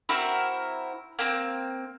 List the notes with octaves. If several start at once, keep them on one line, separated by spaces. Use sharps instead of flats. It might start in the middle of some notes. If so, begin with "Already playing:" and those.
C4 E4 F#4 A#4
A#3 C4